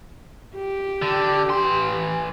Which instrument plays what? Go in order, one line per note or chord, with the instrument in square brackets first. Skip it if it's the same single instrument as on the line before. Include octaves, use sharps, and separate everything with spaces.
[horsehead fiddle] G4
[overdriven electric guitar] D3
E3 C6